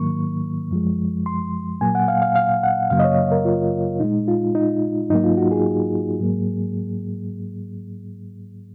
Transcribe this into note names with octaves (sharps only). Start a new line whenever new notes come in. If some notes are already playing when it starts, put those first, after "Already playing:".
Already playing: G#2 D#3 F#3 A#3 C#6
F#2 F3 G#3
C6
A#2 F#3 A#3 G#5
F#5
F5
F5
F5
F#5
F#2 C#3 F#3 A#3 F5
D#5
C#5
A#4
F4
A#2 G#3 D#4
F4
D#4
G#2 F#3 A#3 D#4
F4
F#4
G#4
G#2 F#3 A#3